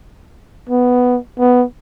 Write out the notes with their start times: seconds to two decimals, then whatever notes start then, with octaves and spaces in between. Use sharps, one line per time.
0.69 B3
1.39 B3